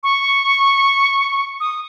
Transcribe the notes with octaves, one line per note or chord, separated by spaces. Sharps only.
C#6
D#6